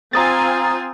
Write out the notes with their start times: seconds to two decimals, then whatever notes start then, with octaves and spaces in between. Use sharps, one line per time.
0.13 C4 F4 G#5 A#5 D#6 A6